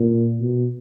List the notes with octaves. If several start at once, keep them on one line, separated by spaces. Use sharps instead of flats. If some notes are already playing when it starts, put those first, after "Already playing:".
Already playing: A#2
B2